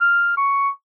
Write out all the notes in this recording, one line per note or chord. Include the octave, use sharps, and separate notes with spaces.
F6
C#6